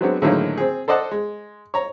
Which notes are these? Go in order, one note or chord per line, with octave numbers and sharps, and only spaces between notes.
F#3 G#3 B3 C4 D4 F#4
A2 D3 D#3 F#3 G#3 A#3
C4 G#4
A4 C5 D5 D#5 F#5 A5
G#3
C#5 A#5